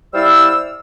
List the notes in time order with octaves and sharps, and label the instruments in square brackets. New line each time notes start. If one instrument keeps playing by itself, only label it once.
[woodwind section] G3 E4 C5 D5 F5 E6